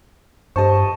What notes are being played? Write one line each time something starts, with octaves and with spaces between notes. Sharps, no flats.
G2 G4 C5 D#5 A5 C#6